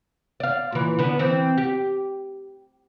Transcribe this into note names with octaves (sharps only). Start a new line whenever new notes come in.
D5 F5
A#2 E3
D3 B3
E3 C4
G4